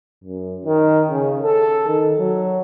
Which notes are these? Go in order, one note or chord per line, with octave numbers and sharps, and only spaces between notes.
F#2
D#3
C#3
A4
D#3
F#3